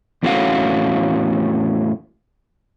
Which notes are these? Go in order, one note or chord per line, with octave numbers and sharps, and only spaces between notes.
E2 A2 A3 C#4 F#4 F5